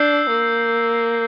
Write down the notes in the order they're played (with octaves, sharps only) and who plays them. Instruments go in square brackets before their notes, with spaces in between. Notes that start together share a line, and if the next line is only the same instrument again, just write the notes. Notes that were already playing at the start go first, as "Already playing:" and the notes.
Already playing: [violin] D4 [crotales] E6 G6 C7
[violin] A#3